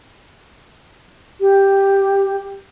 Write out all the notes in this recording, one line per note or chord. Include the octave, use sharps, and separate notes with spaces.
G4